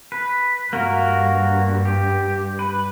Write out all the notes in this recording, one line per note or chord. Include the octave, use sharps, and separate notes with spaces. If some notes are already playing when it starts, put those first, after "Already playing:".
B4
G2 A#3 F#4 A#4
G4
B4